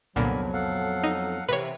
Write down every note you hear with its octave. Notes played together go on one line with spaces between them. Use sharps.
C2 F2 A#2 D3 F#3 B3 G#5 B5
A4 F5 F#5
D#4
C3 E3 C4 A#4 B4 C#5